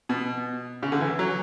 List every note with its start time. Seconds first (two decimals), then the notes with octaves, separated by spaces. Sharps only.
0.09 B2
0.83 C#3
0.92 D3
1.00 E3
1.19 F#3